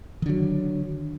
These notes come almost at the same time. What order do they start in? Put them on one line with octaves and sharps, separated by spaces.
D#3 D3 F#3